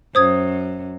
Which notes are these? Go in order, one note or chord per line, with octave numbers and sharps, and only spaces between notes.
F#2 C5 D#6 G#6